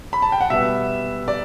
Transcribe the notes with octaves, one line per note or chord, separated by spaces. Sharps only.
B5
A5
G5
F#5
B2 G3 B3 E5
D5